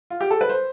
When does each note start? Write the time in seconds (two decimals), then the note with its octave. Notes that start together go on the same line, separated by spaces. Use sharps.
0.10 F4
0.21 G4
0.31 A4
0.41 B4
0.49 C5